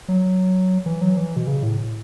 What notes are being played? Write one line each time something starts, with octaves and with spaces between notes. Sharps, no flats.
F#3
E3
F#3
E3
B2
C#3
A2